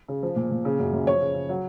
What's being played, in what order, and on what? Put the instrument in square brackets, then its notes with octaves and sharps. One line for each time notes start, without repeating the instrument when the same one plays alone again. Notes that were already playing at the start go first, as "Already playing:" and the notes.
[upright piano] C#3
F3
A#2
A#2
C#3
F#2
F#2
F3 C#5
C#3
C#3
F#3